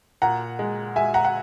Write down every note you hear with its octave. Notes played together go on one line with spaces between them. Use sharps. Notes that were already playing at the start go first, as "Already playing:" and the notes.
A#2 F#5 A#5
G#3
G#3 E5 G#5
F#5 A#5
F#5